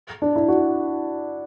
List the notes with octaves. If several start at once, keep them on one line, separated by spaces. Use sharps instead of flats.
D4
E4
F#4